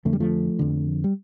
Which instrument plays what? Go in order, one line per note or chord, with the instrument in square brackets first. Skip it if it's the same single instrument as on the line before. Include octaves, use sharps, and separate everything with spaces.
[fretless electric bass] F2 D3 A3
G3
F3 A3
F2 D3
G3